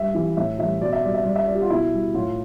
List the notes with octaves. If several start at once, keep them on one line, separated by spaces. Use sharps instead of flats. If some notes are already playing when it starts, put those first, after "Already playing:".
Already playing: G2 E5
E3 G3
A2 E5
E3 G3 E5
B2 D5
E5
G3 D5
E5
G2 D5
E5
F3 D5
G4
F4
B2 E4
G3
A2 F4